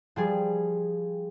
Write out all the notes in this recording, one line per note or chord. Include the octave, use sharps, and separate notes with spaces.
F3 G3 G#4